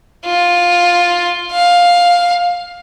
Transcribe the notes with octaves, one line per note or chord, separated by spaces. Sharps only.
F4
F5